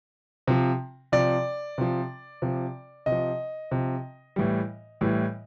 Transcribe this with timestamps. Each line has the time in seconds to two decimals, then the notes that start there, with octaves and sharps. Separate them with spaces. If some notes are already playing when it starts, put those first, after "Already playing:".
0.48 C3 F3
1.12 C3 F3 D5
1.78 C3 F3
2.42 C3 F3
3.06 C3 D#5
3.12 F3
3.71 C3 F3
4.36 A2 E3 G3
5.01 A2 E3 G3